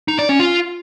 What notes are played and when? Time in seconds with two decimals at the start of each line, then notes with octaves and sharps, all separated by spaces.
0.08 D#4
0.19 D5
0.29 C#4
0.40 F4